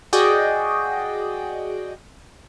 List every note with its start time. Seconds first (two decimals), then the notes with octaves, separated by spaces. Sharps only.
0.13 F#4 G#4 D5 D#5 G5